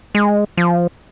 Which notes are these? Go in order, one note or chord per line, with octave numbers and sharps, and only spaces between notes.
G#3
F3